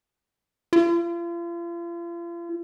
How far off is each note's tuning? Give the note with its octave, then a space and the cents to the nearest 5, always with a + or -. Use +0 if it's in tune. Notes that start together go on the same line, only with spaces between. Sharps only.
F4 -40